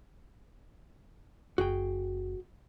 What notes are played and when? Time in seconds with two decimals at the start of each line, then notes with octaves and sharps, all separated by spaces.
1.58 F#1 F#4 G#4 G5